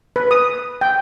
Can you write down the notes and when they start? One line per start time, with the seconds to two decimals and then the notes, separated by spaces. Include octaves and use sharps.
0.16 B4
0.31 D#6
0.81 G5